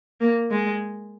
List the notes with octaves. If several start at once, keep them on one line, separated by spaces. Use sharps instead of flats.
A#3
G#3